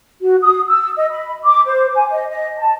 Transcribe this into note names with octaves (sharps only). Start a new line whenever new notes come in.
F#4
D#6
E6
D#5
B5
D6
C5
G#5
D#5
D#5
A5